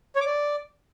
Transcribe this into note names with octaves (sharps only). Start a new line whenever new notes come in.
C#5
D6
D5